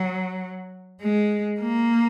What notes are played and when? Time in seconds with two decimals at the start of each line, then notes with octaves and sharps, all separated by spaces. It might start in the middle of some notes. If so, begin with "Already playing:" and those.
Already playing: F#3
1.01 G#3
1.61 A#3